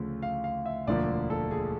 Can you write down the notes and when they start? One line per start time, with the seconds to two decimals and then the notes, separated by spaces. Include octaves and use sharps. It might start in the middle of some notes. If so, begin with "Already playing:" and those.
Already playing: D2 C#3 F3 A3
0.23 F5
0.44 F5
0.66 E5
0.87 E1 D2 D3 F3 A#3 D5
1.30 A4
1.51 G#4